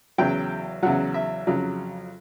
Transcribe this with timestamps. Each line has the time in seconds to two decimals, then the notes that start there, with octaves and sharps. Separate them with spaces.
0.18 E2 C#3 F#3 G5
0.83 E2 C#3 F#3 F#5
1.14 E5
1.47 F2 C#3 F#3